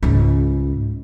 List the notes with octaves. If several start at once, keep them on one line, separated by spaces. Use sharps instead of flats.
C#2 G#2